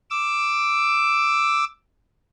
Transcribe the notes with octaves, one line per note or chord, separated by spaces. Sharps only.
D6 E6